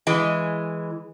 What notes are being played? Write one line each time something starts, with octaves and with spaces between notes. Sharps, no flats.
E3 G#3